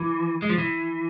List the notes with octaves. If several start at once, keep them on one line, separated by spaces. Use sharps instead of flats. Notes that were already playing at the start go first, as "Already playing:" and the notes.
Already playing: E3
G#3
F3
E3